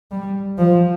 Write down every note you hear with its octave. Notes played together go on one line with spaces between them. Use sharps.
G3
F3